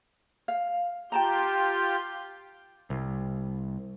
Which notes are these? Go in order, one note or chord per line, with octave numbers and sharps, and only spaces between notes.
F5
F4 G4 G5 A5 A#5 G6
C2